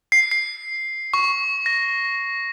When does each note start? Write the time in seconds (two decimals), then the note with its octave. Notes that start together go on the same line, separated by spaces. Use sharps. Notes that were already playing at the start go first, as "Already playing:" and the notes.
0.12 C7
0.31 C7
1.14 C#6
1.66 A#6